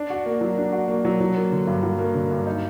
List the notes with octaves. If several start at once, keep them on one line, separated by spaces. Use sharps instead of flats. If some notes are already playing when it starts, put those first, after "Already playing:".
Already playing: D4
F#4
A#3
F#3
D4
F#4
A#3
F#3
F#3
A#3
D3
G2
F#3
A#3
D3
G2
D#4